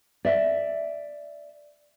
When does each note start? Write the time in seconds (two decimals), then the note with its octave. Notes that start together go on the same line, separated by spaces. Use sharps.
0.25 D5 E5